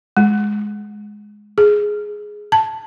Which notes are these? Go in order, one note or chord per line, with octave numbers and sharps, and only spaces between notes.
G#3
G#4
A5